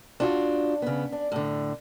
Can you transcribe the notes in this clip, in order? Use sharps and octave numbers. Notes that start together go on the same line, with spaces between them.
D4 F4 F#4
C#3 B3
D4
A2 D3